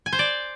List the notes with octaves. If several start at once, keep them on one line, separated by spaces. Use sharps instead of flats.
G#5
C5
D5